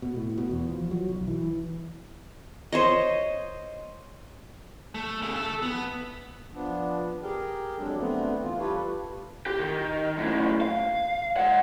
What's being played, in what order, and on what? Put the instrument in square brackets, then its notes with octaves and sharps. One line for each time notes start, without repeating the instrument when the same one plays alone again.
[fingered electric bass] B2
A2
B2
E2
F3
F#3
B1
E3
[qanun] C5 C#5 D#5
[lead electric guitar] A3
C#3 A3
A4 E5
B3
[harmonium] F3 B3 D4
G4 G#4 A#4 G5
F2 F#3 G#3 D4 A4
D3 A3 B3 C4
E3 F4
G3 F4 G4 A4 B4 C#5
[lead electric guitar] G4 G5
D#3
F#2 A2
F5
G#3 F#5